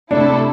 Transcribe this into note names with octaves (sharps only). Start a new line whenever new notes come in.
C3 A3 D4 E4 A4